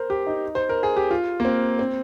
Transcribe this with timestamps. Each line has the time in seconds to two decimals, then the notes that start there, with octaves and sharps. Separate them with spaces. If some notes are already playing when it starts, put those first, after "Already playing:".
Already playing: A#4 C5
0.10 G4
0.27 D#4
0.55 C5
0.69 A#4
0.83 G#4
0.96 G4
1.11 F4
1.40 A#3
1.45 C4
1.79 C4